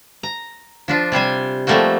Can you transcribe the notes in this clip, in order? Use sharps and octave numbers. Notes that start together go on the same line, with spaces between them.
A#5
F3 D4 F4
C3 G3 C5 G#5
F3 G3 A3 A#3 C4 F#4